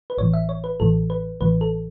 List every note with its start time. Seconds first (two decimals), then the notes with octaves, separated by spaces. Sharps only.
0.10 B4
0.18 A1 A2 E3 C#5
0.33 E5
0.49 C#5
0.64 B4
0.80 A1 A2 E3 A4
1.10 B4
1.41 A1 A2 E3 B4
1.61 A4